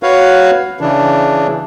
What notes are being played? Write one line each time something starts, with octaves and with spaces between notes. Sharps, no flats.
F#4 B4 C#5 F5
C#3 E3 D4